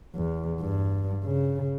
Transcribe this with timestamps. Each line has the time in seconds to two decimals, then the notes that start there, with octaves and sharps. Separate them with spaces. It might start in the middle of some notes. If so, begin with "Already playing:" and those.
0.15 E2
0.61 G2
1.25 C#3